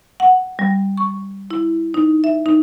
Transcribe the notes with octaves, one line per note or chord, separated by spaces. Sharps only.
F#5
G3
C#6
E4
D#4
E5
D#4